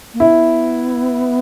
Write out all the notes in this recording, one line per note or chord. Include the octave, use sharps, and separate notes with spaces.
A#3
B3 E4